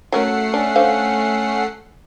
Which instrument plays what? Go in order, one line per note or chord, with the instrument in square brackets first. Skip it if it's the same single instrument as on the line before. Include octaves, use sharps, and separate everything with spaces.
[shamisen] F#3 C#4 A#4 [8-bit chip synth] A3 F#5 C7
[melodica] C#4 [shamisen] D4
[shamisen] D3 C5 F5